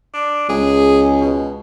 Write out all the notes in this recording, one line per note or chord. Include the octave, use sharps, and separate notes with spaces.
D4
C#2 G#4
B2